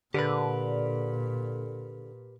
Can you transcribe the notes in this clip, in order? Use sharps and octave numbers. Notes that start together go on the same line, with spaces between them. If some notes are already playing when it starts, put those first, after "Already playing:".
A#2 D3 G4 A#4 B4